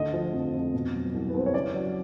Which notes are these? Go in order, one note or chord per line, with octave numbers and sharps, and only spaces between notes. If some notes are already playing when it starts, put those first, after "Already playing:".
Already playing: D2 D3 D#5
F3
F2
F2
B2
F#3
C2
B4
C2 C5
C#5
C#3 D5
F#3